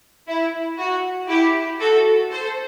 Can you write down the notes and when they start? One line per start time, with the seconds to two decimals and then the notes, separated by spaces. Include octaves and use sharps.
0.27 E4
0.79 F#4
1.28 E4 G4
1.79 F#4 A4
2.31 A4 C5